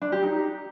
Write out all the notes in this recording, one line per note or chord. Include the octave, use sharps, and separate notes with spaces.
D4
G4
D#4